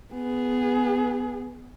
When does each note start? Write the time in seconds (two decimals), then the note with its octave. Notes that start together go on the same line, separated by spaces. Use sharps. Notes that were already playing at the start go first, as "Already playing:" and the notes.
0.14 B3 G#4